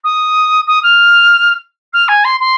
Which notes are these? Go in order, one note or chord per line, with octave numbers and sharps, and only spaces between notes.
D#6
D#6
F6
F6
G#5
C6
C6